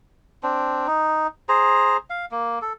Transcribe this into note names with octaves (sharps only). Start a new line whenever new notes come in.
C4 D4
D#4
G#4 C5 A#5
F5
A#3
A4